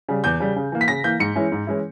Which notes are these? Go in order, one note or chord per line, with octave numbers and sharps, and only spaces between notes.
C#3 G3
E2 G6
C#3 G3
C#3
E3 A#3
B6
C#3 A#6
E3 A#3 G6
G#2 C#7
E3 G#3 C#4 E4
G#2
E3 G#3 C#4 E4